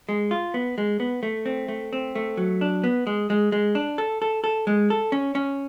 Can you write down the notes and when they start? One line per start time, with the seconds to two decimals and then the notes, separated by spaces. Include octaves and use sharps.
0.09 G#3
0.31 F4
0.54 B3
0.78 G#3
1.00 B3
1.23 A3
1.46 C4
1.68 A3
1.93 C4
2.15 A3
2.37 F#3
2.61 D4
2.84 B3
3.07 G#3
3.30 G#3
3.52 G#3
3.75 D4
3.98 A4
4.22 A4
4.44 A4
4.67 G#3
4.90 A4
5.12 C#4
5.35 C#4